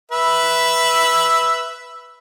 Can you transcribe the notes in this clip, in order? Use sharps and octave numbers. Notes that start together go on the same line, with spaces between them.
B4 E5